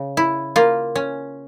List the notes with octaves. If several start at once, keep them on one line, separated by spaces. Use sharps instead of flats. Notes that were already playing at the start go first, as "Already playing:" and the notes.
Already playing: C#3
E4
A#3 F4
C#4